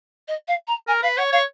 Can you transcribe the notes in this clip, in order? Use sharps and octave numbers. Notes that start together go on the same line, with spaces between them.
D#5
F5
A#5
A#4 G#5
B4 F5
C#5 F#5
C#5 F5